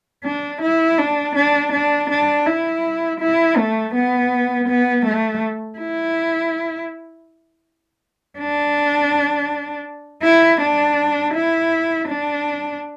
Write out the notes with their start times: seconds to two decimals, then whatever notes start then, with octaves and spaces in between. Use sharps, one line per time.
0.24 D4
0.61 E4
0.98 D4
1.35 D4
1.72 D4
2.10 D4
2.46 E4
3.20 E4
3.57 A3
3.94 B3
4.68 B3
5.06 A3
5.79 E4
8.39 D4
10.23 E4
10.61 D4
11.35 E4
12.09 D4